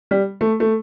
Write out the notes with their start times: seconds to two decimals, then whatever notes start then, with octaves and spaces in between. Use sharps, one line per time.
0.11 G3
0.41 A3
0.60 A3